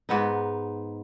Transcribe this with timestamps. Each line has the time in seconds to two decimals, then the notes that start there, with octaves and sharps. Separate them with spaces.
0.09 G#2 B3 D#4